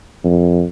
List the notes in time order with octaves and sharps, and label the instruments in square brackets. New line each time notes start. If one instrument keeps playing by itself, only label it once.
[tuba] F2